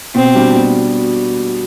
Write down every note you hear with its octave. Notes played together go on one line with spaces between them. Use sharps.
B2 C4
G3 D4 G4
B2